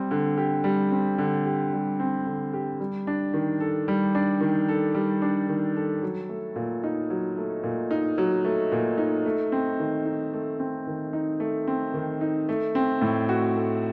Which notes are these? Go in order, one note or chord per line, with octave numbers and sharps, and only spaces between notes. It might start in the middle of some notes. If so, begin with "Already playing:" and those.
Already playing: G3 C4
D3
G4
G3
C4
D3
G4
G3
C4
D3
G4
G3
D4
D#3
A4
G3
D4
D#3
A4
G3
D4
D#3
A4
F#3
A3
A#2
D#4
F#3
A3
A#2
D#4
F#3
A3
A#2
D#4
A3
C4
D#3
D#4
A3
C4
D#3
D#4
A3
C4
D#3
D#4
A3
C4
A2
F#4
A3